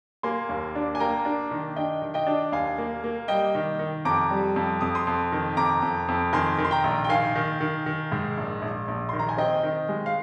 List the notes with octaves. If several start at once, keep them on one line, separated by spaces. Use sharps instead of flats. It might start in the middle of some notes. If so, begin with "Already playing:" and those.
A#3 G#5 C6
D#2
D4
G#5
A#3 G5 A#5
D4
D#3
D4 D#5 G5
D#3
D#5 G5
D4
D#2 F5 G#5
A#3
A#3
G3 D#5 G5
D#3
D#3
F2 A#5 D6
G3
F2
F2 D#6
C6 D#6
F2
D#3
F2 A#5 D6
F2
F2
D#3 G#5 C6
D#3
C6
G5 A#5
A#1
G5
D#3 F5 G#5
D#3
D#3
D#3
G#2
A#1
A#1
A#1
D#3 C6
A#5
G#5
C4 D#5 G5
D#3
G#3
F5